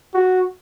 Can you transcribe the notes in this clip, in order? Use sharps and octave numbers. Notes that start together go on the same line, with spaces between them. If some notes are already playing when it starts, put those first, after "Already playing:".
F#4